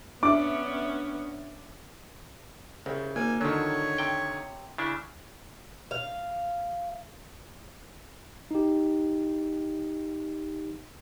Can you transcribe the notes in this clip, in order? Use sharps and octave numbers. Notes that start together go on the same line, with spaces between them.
B3 C#4 D4 E5 D6
C2 C#3
G#1 A#3 G#5
D3 D#3 F3 F#3 C#5
C3 G5
C#3 D4 E4
F5
D#4 G4